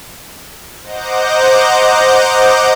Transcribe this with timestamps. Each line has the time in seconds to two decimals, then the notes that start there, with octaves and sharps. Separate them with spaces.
0.82 C5 D#5 F#5 A#5 D6 G6